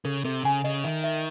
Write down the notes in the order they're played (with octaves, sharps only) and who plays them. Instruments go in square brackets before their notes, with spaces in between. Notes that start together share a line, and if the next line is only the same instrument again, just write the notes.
[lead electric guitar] C#3 [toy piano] A4
[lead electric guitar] C3 [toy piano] A4
[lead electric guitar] C#3 [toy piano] G#5
[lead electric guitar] C#3 [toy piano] D#5
[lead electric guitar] D#3 [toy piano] E5
[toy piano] E5